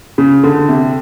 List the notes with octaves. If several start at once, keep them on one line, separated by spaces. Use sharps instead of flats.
C#3
D3
C3